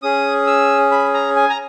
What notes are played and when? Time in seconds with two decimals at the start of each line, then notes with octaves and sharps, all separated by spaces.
0.02 C#4 G#4 D#6
0.47 E6
0.91 B5
1.14 A#5
1.36 G#5
1.50 A#5